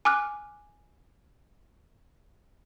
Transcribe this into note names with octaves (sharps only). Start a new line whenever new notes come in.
G#5 D6 F6 F#6